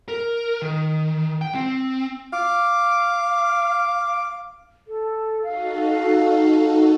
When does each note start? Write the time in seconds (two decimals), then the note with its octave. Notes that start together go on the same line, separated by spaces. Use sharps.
0.08 A#4
0.62 D#3
1.41 G5
1.55 C4
2.33 F5 D6
4.88 A4
5.43 D#4 F#4 A4 F5